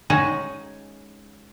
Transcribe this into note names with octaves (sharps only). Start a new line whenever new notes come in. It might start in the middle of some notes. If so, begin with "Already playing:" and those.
G#3 C#4 D#4 F#4